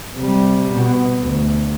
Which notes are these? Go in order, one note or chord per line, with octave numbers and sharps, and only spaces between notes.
C3 G3
B2
D2